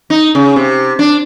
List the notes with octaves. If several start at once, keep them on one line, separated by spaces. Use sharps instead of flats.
D#4
C#3
C3
D4